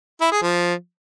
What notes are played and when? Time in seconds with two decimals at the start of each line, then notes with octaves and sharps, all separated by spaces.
0.21 E4
0.32 G#4
0.42 F3